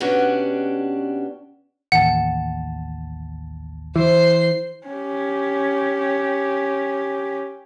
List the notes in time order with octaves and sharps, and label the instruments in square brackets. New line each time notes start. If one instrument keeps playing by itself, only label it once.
[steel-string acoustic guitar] B2 C#4 D4 F#4 G4
[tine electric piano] A1 D#2 A5 [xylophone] F#5
[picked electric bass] E3 [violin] C5 C7
[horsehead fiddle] C#4 G4